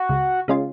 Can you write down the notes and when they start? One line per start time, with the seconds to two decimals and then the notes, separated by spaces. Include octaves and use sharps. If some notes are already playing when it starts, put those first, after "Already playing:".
Already playing: F#4
0.09 C#2
0.48 C#3 G#3 C#4 F4